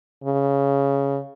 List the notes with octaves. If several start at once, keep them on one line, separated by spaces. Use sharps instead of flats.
C#3